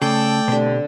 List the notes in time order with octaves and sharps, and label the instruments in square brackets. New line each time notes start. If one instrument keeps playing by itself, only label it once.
[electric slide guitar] C#3 [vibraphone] A3 [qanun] A4 [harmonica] D5 G5
[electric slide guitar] B2 G4 [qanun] D3 C4